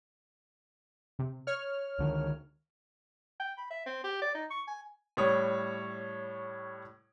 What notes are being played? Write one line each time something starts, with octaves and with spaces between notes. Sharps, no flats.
C3
C#5 F6
C#2 D3 D#3
G5
B5
E5
C4
G4
D5
D#4
C#6
G#5
A2 G3 C#5 D#6